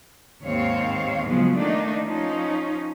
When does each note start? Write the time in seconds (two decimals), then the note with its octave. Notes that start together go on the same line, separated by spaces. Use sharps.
0.43 D#2 G#2 C4 C#5 F5
1.27 C#3 F3 F#3 G#3 B3
1.56 D#3 A3 A#3 D4 D#4
2.02 F3 C#4 D#4